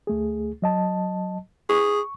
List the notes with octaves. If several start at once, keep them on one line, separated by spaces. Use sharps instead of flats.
D2 A3 G#4
F#3 D#5 A5
G#4 C#6